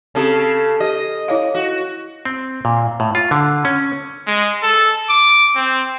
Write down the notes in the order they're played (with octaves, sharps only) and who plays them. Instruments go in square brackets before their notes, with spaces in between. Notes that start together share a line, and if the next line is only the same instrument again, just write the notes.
[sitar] C#3 A4 [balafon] C4 G4
[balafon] G4 [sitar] D#5
[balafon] E4 C#5 F5
[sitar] F#4
[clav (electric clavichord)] C4
A#2
A2
F4
D3
C#4
[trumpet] G#3
A4
D6
C4